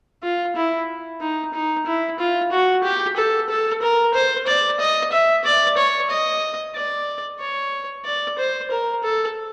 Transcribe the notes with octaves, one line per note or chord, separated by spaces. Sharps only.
F4
E4
D#4
D#4
E4
F4
F#4
G4
A4
A4
A#4
C5
D5
D#5
E5
D5
C#5
D#5
D5
C#5
D5
C5
A#4
A4